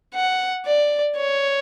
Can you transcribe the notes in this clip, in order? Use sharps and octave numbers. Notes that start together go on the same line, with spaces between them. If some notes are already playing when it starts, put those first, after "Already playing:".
F#5
D5
C#5